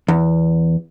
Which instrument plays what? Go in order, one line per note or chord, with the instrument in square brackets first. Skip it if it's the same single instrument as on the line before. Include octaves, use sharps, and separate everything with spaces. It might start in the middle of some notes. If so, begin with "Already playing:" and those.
[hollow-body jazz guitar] E2